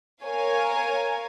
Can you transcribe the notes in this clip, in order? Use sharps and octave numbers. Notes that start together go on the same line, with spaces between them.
A#4 C#5 F5 G#5